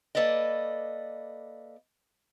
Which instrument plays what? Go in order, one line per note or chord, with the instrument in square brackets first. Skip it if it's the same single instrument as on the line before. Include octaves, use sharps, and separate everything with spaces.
[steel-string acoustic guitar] A#3 A4 B4 D5 D#5